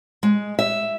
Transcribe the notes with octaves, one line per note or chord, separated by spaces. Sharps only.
G#3
E5